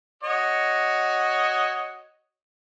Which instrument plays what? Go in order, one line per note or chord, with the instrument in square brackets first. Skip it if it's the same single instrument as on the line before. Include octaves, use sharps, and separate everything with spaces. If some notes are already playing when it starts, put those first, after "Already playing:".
[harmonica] F#4 C#5 D#5